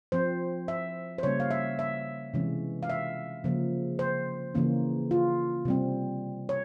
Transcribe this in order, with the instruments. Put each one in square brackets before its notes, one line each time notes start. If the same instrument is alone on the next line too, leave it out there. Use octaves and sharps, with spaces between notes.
[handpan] F3 C4 C5
E5
C5
C#3 G3 A#3 C#4 C#5
F5
E5
E5
C3 E3 G#3 C#4
F5
E5
C#3 F3 A#3
C5
C#3 E3 A#3 C#4
F4
C3 G3 C4
C#5